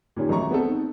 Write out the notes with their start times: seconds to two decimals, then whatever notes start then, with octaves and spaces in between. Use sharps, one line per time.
0.16 A#2 D#3 C#4 G4
0.29 A1 F#3 A3 A#5 C#6
0.51 B3 C4 A4
0.68 D#4